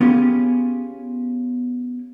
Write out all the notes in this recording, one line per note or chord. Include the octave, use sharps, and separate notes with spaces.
B3 C#4 F4 G4 G#4